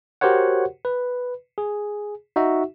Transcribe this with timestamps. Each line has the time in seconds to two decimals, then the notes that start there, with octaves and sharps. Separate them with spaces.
0.21 F#4 G4 A#4 C5 C#5 F#5
0.85 B4
1.58 G#4
2.36 D#4 F#4 E5